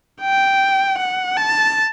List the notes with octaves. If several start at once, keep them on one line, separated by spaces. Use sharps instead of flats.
G5
F#5
A5